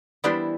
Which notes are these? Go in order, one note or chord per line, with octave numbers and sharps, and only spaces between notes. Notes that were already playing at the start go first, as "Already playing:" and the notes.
E3 G3 B3 D4 E4 G4 C5